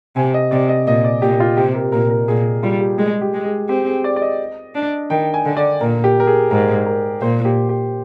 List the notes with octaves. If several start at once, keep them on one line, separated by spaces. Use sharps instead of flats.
C3 G#5
D#5
C3 D5
D#5
A#2 D#5
D5
A#2 G4
F4
C3 G4
A#4
A#2 A#4
A#4
A#2 G#4
G3 F4
G4
G#3 G#4
G4
G#3
G#4
C4 G4
G#4
D5
D5
D#5
D4
D#3 G5
G#5
D3
D5
A#2 A#4
G4
A#4
G#4
G#2 A#4
A#4
A#2 C5
G4
G4